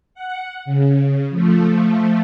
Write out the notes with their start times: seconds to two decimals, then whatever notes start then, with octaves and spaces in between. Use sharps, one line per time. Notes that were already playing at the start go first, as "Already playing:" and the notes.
0.14 F#5
0.65 C#3
1.30 F3 A3